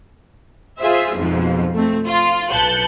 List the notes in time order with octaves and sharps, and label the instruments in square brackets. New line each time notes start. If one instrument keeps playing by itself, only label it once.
[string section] F4 G#4 C5 E5
F2 G#2 B2 F3
A3 C4
F4
B1 B4 A5 F#6 G6 C#7